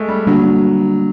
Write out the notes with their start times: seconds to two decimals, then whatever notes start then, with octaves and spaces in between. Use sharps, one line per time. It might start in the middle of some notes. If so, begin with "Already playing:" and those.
Already playing: G#3 A3
0.08 G3
0.27 D3 F#3 G3 A#3 D4